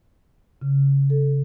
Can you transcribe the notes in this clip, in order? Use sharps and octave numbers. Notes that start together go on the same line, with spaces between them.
C#3
A4